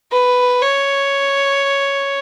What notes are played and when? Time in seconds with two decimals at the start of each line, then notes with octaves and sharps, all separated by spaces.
0.12 B4
0.62 C#5